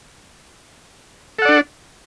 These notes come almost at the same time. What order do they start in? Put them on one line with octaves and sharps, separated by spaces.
A4 F#5 D5 D4